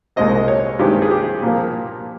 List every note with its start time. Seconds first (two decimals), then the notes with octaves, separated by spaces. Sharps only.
0.16 C2 A#2 G#3 C4 D#5
0.48 C#5
0.79 G2 D#3 G#3 C4 G4
1.02 G#4
1.11 G4
1.42 A#2 F3 A#3